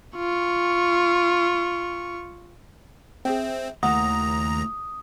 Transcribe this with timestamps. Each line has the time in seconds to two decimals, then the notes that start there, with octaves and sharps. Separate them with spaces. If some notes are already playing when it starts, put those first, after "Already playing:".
0.17 F4 C#6
3.25 C4 G#4 E5 G5
3.83 D#2 C#3 A3 E4 F#5 A#5 D#6